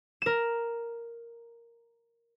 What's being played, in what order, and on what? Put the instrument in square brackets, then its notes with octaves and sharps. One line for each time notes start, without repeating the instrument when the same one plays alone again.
[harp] A#4 E7